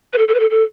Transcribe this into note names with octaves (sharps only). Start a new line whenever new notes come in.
B4
A4
A4
B4
A4
A4